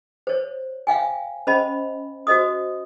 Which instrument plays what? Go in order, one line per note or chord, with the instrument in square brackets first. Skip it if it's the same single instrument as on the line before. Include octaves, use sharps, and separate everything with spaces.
[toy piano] C5 C#5
E5 F5 G5 G#5
C#4 C5 D#5 B5
F#4 C5 D#5 D#6